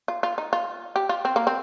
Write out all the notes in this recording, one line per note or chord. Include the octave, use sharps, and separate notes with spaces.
F4
F4
D#4
F4
G4
F4
C4
A#3
C4